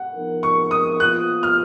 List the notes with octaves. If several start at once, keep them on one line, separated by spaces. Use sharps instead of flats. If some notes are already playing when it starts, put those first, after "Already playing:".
Already playing: F#5
F3 B3 D#4 A#4
C#6
D#6
A#2 F3 B3 F4 F#6
F6